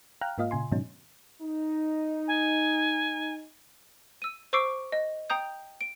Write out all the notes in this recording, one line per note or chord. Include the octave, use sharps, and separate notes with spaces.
F5 G5 A#5 F6 F#6
G#2 A#3 F4 D#5 F5
A#2 C#3 G#5 C6
G#2 B2 D#3 F#3 C#4 D#4
D#4
G#5
E6 D#7
C5 C#6 D6 E6 C7 D7
D#5
G5 A#5 D#6 G6
D7